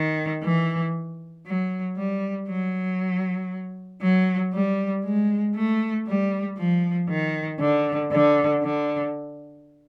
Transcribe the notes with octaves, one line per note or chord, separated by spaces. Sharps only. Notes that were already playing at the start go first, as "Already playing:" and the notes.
Already playing: D#3
E3
F#3
G3
F#3
F#3
G3
G#3
A3
G3
F3
D#3
D3
D3
D3